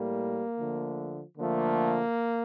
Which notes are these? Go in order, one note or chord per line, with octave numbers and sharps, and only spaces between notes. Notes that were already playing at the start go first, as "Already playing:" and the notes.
Already playing: A2 G3 A#3
D3 F3 A3
D3 F3 A3 A#3